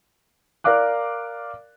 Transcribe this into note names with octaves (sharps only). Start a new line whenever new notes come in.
A#4 D5 F5 D6 F#6